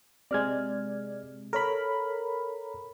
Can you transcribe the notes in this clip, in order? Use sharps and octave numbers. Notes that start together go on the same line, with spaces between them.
C3 G#3 D5 F6 G#6
A4 A#4 C#5 A#5 B5